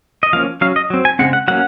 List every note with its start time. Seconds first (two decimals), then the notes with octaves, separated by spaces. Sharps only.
0.23 D#5
0.33 F3 A#3 C#4 F5
0.61 F#3 C#4 F5
0.76 D#5
0.90 F#3 C4
1.05 G#5
1.19 C#3 G#3 C4 F#5
1.33 F#5
1.48 F#3 A#3 C#4 F#5